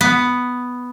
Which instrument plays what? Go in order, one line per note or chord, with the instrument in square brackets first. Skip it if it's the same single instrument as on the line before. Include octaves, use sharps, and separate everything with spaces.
[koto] B3